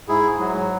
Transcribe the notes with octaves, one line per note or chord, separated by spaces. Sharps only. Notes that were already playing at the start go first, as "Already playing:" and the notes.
G#2 E4 G#4
F#3